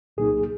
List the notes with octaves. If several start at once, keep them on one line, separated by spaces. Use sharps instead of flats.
C2 A#2 F#3 A#3 D#4 G#4